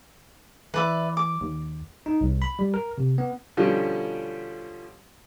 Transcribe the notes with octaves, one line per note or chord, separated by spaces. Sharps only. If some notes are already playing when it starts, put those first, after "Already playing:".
E3 B4 D5 E5
D6
D#2
D#4
C2
B5
G3
A#4
C3
B3
B2 D3 F3 G3 C#4 G4